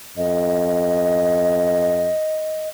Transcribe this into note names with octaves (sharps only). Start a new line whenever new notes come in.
F2 D#5